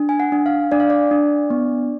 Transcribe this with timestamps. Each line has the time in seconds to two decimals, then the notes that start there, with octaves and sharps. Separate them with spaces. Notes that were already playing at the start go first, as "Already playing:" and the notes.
Already playing: D4
0.09 G#5
0.20 F#5
0.32 D4
0.46 F5
0.72 D4 D5
0.80 F5
0.90 D5
1.11 D4
1.50 B3